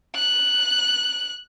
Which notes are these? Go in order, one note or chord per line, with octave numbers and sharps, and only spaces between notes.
F#6